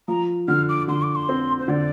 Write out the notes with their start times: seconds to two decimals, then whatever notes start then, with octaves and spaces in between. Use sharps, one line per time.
0.08 F3 A#5
0.48 D3 F6
0.68 D6
0.88 D3 C6
1.02 D6
1.15 C6
1.29 C4
1.59 C5
1.68 D3 D5